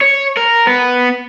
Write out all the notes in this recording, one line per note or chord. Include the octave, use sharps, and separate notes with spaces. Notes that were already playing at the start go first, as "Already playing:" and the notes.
C#5
A#4
B3